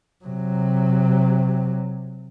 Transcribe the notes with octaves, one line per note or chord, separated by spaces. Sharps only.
C3 F#3